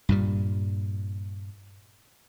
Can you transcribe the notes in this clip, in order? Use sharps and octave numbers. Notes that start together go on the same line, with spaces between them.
G2 A#2 G3